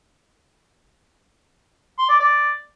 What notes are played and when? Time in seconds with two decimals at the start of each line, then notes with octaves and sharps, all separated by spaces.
1.99 C6
2.09 D5
2.20 D5